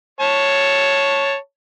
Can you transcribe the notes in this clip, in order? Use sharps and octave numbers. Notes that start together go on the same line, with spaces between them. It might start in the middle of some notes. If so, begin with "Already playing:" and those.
C#5 A5